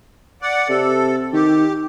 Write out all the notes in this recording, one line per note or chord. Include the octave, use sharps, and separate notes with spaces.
D5 F#5
C3 A4
D#3 G4